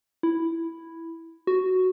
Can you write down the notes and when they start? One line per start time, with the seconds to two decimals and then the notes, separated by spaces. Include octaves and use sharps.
0.23 E4
1.47 F#4